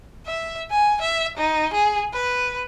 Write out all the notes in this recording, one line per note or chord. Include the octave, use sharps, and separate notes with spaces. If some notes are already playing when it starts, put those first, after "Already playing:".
E5
G#5
E5
D#4
G#4
B4